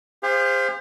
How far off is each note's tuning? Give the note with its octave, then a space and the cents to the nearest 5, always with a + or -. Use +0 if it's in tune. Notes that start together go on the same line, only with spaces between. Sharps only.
G#4 -45 C5 +0 F5 +0